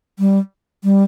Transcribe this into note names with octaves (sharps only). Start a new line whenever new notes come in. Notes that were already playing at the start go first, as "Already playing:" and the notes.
G3
G3